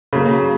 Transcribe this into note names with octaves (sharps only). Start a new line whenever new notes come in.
C#3 F#3 A#3